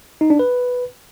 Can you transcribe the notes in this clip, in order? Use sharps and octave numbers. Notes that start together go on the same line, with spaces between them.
D#4
D4
B4